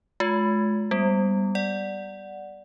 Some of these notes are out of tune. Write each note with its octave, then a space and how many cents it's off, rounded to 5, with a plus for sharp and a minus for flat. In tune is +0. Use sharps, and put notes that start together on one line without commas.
G#3 +35 F4 +25
G3 +0 B3 +0
D5 +0 F#5 +0